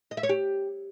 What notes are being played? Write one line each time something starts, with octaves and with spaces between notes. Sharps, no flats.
D#5
E5
C#5
G4